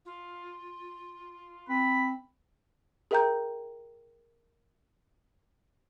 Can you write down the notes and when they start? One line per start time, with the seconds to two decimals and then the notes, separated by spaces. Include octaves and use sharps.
0.06 F4
1.69 C4 B5
3.11 G#4 A#4 E5 G5 A#5 G6